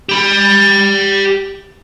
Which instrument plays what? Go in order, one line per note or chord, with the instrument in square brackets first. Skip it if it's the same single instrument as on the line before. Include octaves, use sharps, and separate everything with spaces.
[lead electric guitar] G4 B5